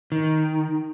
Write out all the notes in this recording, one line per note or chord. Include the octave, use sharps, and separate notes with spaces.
D#3